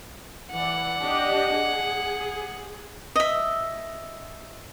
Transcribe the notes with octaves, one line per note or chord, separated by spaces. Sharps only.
E3 D5 F#5
D4 G4 D#5
G#4
D#5 E5